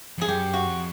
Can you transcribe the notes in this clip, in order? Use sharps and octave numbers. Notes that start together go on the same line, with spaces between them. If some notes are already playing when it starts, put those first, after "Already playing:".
F2 G#4
F#2 G4
F#4
F2